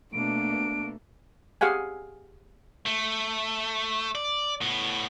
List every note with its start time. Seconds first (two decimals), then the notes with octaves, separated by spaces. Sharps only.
0.13 B2 A3 A#3 D4 D7
1.61 G4 G#4 F5 F#5 G#5
2.86 A3
4.15 D5
4.61 A2 B3